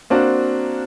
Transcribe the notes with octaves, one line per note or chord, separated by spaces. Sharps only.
A#3 C4 D4 F#4